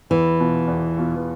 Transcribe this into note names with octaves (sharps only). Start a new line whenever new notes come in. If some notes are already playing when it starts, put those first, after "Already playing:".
E2 E3
B2 B3 F4
E2
B2 B3 F4